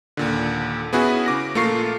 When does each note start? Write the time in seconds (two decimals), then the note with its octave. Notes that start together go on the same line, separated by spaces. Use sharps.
0.17 D#2 A#2 D3
0.93 B3 C#4 E4 F#4 G#4 B4
1.26 C#3 D6 A#6
1.55 A#1 A3 A#3 F4 C#6 C7